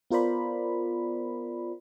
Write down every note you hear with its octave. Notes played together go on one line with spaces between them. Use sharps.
B3 F4 A#4 C5 D5 B5